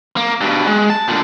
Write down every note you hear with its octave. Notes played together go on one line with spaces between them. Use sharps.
A#3
G2 B2
G#3
A5
A#2 D3